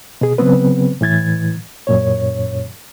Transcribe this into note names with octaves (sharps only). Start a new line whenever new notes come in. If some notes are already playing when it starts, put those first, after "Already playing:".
B2 G#4
C#3 F#3 B3 C4 B4
A2 E3 G#6 A6
F#2 A#2 C#5